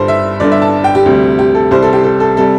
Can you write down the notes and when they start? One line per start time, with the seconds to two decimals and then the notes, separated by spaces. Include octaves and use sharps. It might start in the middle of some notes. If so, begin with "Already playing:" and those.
Already playing: G1 G2 G3 A4 C5
0.08 E5
0.40 G1 G2 D3 D5
0.52 E5
0.62 A5
0.84 G5
0.95 G4
1.06 D2 C3 G3
1.39 G4
1.55 A4
1.71 C2 C3 G3 C5
1.83 A4
1.93 G4
2.04 A4
2.20 A4
2.37 C3 G3 A4